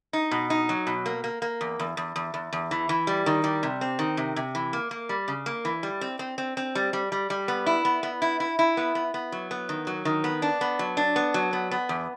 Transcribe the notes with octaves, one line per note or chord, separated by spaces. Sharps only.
D#4
B2
D#4
F#3
B2
A#3
A#3
A#3
E2
E2
E2
E2
E2
E2
E3
E3
G3
D#3
G3
C3
C4
D#3
C3
C3
E3
A#3
A#3
G3
C#3
A#3
E3
G3
C4
C4
C4
C4
G3
G3
G3
G3
B3
E4
B3
B3
E4
E4
E4
B3
B3
B3
F#3
B3
D#3
F#3
D#3
B3
D4
B3
F#3
D4
B3
F#3
B3
B3
E2